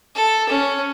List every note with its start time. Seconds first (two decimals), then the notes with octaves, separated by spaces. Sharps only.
0.15 A4
0.49 C#4